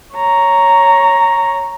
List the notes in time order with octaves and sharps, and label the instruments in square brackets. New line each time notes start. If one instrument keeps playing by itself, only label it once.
[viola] C#5 A#5